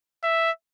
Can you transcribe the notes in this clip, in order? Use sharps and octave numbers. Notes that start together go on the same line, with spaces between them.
E5